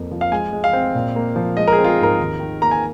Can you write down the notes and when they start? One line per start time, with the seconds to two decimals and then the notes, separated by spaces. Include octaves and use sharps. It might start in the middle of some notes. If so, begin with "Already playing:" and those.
Already playing: F2 A#3
0.11 F3
0.21 F5
0.32 G#3 G#5
0.53 G#3
0.64 F5
0.73 C4
0.95 A#2
1.16 A#3
1.36 F3
1.57 G#3 D#5
1.68 A#4
1.73 G#4
1.78 C4
1.84 F4
1.88 G#4
1.99 G#2 A#4
2.19 D#2
2.40 D#3
2.61 A#3 A#5
2.71 G#5